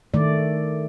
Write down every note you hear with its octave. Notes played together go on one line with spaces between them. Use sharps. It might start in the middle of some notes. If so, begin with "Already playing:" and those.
D#3 A3 D5